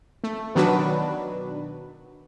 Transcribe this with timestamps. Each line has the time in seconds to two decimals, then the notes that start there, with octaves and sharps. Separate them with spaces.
0.24 A3
0.55 B2 D#3 F#3 D4 F#4 B4